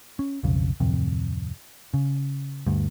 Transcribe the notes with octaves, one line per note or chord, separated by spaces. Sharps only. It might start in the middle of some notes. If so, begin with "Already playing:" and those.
C#4
B1 F2 C#3
D1 F2 C3
C#3
D2 G2